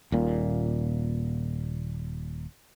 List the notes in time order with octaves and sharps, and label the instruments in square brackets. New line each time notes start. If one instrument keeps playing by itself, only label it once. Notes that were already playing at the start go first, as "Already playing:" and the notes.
[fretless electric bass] D#1 A#2